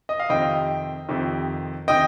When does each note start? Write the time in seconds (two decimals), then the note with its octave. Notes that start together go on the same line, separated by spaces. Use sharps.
0.09 D#5
0.20 F5
0.29 F2 C3 D#3 D#5 G5
1.09 F2 C3 D#3
1.88 C3 D#3 D#5 G5